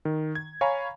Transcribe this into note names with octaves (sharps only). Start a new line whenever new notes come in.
D#3
G#6
C#5 F5 G#5 A#5 B5